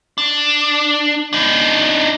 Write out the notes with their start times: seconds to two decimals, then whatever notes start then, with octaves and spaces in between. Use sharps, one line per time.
0.18 D4
1.33 D4 D#4